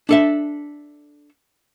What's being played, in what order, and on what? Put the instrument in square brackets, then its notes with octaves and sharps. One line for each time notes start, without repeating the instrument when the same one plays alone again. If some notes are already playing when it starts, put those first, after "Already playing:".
[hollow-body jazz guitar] D4 A4 E5